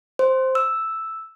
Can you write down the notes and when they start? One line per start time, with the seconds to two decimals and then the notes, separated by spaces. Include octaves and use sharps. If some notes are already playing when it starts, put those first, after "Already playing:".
0.19 C5
0.55 E6